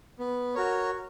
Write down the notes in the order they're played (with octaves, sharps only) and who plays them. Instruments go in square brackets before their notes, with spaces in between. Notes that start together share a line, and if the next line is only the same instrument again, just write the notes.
[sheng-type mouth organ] B3
F#4 A#4 C#5